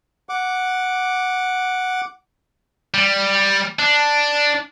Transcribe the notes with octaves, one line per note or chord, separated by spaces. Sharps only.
F#5 D6
G3
D4